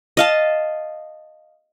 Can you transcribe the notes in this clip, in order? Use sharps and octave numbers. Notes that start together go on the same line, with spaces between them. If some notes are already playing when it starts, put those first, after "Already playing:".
D#5 F5 A5